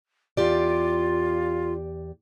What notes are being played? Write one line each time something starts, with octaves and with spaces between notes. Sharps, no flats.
E2 F4 G4 D5